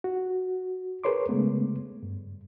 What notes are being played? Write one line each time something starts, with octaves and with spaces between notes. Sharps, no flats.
F#4
G#4 A#4 B4 C#5 C6 D6
C#3 G#3 A3 B3
G2